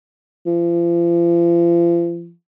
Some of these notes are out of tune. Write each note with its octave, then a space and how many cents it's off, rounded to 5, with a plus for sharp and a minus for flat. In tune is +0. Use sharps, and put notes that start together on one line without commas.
F3 -40